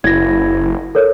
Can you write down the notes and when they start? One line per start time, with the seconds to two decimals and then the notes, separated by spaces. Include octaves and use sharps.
0.04 F#1 E4 G#6 A#6
0.95 A4 A#4 C#5